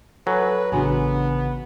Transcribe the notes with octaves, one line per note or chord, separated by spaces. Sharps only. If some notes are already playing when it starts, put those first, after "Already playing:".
F#3 A4 B4 G#5
A1 C#3 B3 D4 F#4 G#5